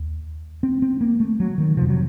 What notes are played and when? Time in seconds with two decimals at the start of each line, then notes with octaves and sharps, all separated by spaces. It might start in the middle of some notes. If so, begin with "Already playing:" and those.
Already playing: D#2
0.63 C4
0.82 C4
1.01 A#3
1.20 A3
1.40 F#3
1.58 D#3
1.77 F2 C3 F3
1.89 F#3